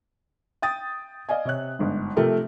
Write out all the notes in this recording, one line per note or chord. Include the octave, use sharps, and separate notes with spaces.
G5 D#6 A6
D5 D#5 F5 G#5
C3 C#5 F#6
G1 G#2
C3 F3 A3 G4 A#4